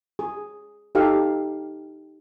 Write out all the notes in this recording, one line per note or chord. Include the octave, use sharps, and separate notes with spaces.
G#4
D#4 G4 A4 F5